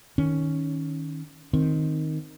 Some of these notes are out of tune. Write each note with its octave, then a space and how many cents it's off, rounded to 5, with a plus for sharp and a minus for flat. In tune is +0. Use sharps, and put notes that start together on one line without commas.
D#3 +0 C#4 +0
D#3 +0 C4 +0